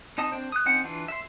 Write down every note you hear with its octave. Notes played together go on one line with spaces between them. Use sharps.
C4 D#4 D#5 A5 D#6
C4 D4 C5
D#6 F#6
C4 C#4 D#4 C5 F#5
E3 D4 F4
E5 C6